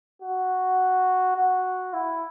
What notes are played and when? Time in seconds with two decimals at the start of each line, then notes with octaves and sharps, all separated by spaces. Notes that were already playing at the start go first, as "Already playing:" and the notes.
0.22 F#4
1.37 F#4
1.93 E4